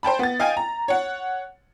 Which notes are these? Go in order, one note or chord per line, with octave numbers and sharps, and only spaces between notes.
C5 G5 A5 B5
B3 A6
D#5 F5 G5 G#5
A#5
C#5 F#5